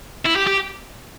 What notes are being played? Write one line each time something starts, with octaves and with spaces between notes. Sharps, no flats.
E4
G4
G4